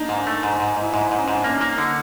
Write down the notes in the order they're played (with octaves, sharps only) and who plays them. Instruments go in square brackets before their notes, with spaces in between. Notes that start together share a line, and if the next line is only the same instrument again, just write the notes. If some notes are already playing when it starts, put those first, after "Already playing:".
Already playing: [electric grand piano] A#3 D4 D#4
[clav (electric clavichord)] G#2
A3
G#2
G#2
[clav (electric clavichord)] G#2 [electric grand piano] E4
[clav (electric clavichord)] G#2 [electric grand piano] D#4
[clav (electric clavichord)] G#2
[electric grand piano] C#4
[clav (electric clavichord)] G#2
[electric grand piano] D4
[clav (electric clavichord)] A#3 [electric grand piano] C#4
[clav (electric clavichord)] A#3 [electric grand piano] D#4
[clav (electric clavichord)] D3 [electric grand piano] D#4